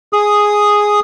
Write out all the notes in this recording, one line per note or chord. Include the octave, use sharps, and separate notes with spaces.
G#4 D#6